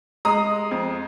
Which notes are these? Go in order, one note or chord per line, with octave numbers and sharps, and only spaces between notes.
G#3 A#5 D#6
F2